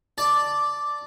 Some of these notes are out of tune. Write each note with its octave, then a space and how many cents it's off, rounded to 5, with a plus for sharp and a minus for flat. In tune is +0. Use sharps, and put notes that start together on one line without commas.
D5 +0 A5 +0